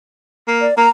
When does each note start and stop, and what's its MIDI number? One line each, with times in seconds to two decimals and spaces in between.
0.48 0.67 58
0.61 0.74 74
0.77 0.87 58
0.77 0.89 82